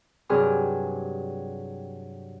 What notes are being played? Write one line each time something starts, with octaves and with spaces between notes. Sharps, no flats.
G2 C3 F#3 G#4 B4 F6